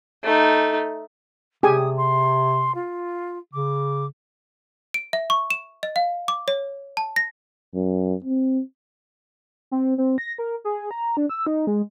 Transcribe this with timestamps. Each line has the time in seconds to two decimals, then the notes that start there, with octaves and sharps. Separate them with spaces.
0.24 A3 D#4
1.63 C3 G4 G#4 G#5 D#6
1.97 C6
2.75 F4
3.53 C#3 D6
4.94 D7
5.13 E5
5.30 C#6
5.50 E7
5.83 D#5
5.96 F5
6.28 D6
6.48 C#5
6.97 A5
7.16 A#6
7.75 F#2
8.24 C4
9.71 C4
9.98 C4
10.18 A#6
10.38 A#4
10.65 G#4
10.91 A#5
11.17 D4
11.30 E6
11.47 D#4
11.67 G#3